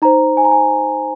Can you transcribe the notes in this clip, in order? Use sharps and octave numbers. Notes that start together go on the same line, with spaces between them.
D#4 C5 A#5
G#5
A#5
G#5